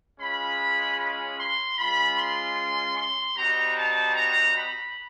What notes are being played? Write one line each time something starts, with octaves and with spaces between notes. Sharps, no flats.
G#3 C#4 F4 B5
B5
C6
G#3 C#4 F4 B5
C6
C6
G3 C4 D#4 F#4 A#5
A5
A#5
B5